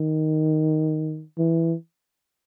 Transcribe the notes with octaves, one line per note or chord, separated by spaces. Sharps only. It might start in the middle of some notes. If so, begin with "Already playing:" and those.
Already playing: D#3
E3